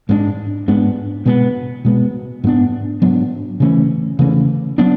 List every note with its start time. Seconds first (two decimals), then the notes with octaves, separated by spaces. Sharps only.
0.09 G#2 G#3 B3 D4
0.68 G#2 G#3 B3 D4
1.26 B2 G#3 B3
1.85 B2 G#3 B3
2.44 G#2 F#3 B3 D4
3.02 G#2 F#3 B3 D4
3.60 C#3 E3 A3 C#4
4.19 C#3 E3 A3 C#4
4.78 F#3 B3 D4